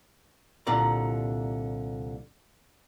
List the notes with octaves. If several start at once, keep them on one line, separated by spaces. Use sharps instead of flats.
C2 A#2 D3 D5 A#5